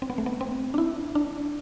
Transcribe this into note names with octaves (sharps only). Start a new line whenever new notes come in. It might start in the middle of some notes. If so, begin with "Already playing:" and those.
C4
B3
A3
B3
C4
D4
E4
D4